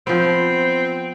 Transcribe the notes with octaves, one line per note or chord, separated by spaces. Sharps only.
F3 B3 C4